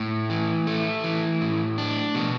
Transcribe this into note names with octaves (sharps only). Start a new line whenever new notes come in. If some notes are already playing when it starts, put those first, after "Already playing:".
Already playing: A2
E3
A3
E3
A2
D4
B2